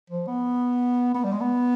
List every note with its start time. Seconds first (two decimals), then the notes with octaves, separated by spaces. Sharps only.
0.10 F3
0.27 B3
1.14 B3
1.24 G3
1.32 G#3
1.41 B3